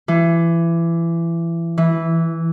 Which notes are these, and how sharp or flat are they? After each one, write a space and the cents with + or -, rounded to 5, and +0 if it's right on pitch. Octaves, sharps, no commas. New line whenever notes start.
E3 +25
E3 -5